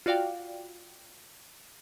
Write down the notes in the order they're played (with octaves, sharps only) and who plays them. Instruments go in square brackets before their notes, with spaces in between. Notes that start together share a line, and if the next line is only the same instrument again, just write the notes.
[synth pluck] F4 F#4 D5 F5 G5